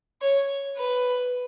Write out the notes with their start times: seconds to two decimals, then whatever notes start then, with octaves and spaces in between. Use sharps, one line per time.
0.22 C#5
0.78 B4